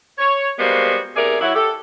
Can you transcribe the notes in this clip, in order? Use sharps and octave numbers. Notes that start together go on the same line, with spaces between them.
C#5
G3 G#3 A#3 B3 F#4 C5
E2 C3 A3 G#4 A#4 D5
F#3 E4
G4 A4